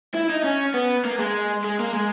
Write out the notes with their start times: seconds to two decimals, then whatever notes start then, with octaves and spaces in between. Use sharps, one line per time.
0.15 E4
0.30 D#4
0.44 C#4
0.74 B3
1.05 A#3
1.19 G#3
1.64 G#3
1.80 A#3
1.94 G#3